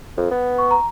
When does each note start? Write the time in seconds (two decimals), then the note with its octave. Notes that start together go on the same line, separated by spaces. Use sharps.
0.17 F2
0.31 B3
0.58 C#6
0.71 A#5